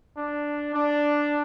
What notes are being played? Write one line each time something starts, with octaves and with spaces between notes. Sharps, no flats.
D4
D4